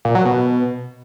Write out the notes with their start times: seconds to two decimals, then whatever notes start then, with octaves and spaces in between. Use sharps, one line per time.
0.05 A#2
0.15 F#3
0.25 B2